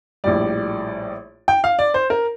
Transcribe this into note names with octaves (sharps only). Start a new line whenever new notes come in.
A#1 A2 G3 D5
G5
F5
D5
C5
A#4